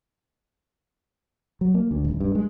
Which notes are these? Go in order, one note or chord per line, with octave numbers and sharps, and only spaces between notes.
F#3
A#3
D2
D#1
G2
G#3